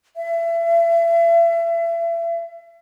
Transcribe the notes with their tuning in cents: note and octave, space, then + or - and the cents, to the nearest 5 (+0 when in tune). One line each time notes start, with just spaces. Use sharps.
E5 +35